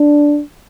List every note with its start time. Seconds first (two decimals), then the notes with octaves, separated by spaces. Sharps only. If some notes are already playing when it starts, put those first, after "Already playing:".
Already playing: D4